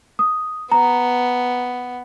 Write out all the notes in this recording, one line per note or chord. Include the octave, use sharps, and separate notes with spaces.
D#6
B3 A#5